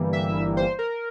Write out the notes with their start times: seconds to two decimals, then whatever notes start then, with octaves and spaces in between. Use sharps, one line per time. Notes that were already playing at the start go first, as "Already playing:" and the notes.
Already playing: G1 G2 E3 G3 A#3
0.13 E5
0.57 C5
0.79 A#4